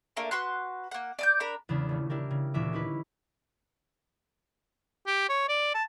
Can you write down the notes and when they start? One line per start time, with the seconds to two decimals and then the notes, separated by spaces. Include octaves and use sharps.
0.17 A3 A#3 D4 A#4
0.31 F#4 B4 C6 F#6
0.91 A#3 F#5
1.19 D5 D#6 G6
1.40 D4 A#4 A#5 B5
1.69 E2 C#3 G#3 D4
1.89 D#1 A3
2.10 D4 E4 G4 A#4
2.31 C#3
2.54 D#1 D2 A#2 E3 E5 D6
2.73 C#4 D#4 E4 B4
5.07 G4
5.29 C#5
5.48 D5
5.74 A5